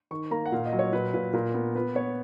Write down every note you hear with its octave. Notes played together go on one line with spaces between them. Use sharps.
D#3 C#6
A#3 A#5
F#5
A#2 F5
D#5
F#3
C#5
A#2 B4
A#2 B4
A#2 A#4
B3
B3 B4
B3 C#5